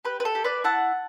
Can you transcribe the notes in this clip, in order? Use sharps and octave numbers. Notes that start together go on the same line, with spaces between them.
G4 B4
B4
A4
G4
B4 D5
E4 F#5 A5